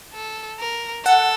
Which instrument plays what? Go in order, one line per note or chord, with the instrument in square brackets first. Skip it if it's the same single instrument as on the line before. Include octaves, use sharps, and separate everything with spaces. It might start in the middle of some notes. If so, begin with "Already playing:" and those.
[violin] A4
A#4
[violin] A4 [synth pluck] F#5